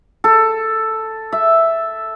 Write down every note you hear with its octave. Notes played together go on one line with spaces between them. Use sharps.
A4
E5